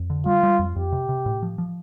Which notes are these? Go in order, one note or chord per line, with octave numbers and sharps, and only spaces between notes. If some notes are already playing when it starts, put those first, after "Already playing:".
Already playing: F2
D3
G3 F4
G3
F2
F2 G4
C3
C3
A2
F3
F3